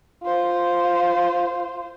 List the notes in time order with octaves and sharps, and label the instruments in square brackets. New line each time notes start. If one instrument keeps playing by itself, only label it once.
[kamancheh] F4 C5